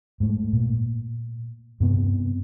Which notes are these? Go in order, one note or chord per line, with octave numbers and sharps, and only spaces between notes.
G#2 A3
A#2
G2 C3 B3 C4